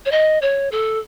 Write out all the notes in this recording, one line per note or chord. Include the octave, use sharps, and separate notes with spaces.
C#5
D#5
C#5
A4